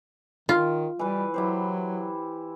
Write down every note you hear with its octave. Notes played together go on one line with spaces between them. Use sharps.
D#3 F4
E3 G3 B4
F#3 E4 G4 C5